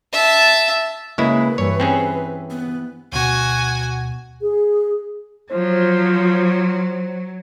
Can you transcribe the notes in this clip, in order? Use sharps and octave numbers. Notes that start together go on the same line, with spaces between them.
E5 A5
C#3 G#3 A#3 E4 B4 D#5
G2 E3 C#5
C4 C#4 G#4
B3
D2 B2 F#4 G#5
G#4
F3 F#3 C5